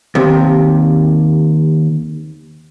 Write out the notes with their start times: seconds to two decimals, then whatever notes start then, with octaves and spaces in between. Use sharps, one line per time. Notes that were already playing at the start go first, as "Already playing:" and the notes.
0.15 D#2 C3